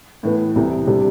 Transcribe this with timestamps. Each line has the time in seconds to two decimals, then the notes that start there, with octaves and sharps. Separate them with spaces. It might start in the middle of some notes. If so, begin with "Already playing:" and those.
0.23 A2 E3 B3
0.56 C2 C3 E3
0.87 C3 G3 D4